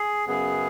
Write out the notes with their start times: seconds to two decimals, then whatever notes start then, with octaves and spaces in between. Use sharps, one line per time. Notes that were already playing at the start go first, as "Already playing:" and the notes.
Already playing: G#4
0.27 F#2 C#3 B3 G#4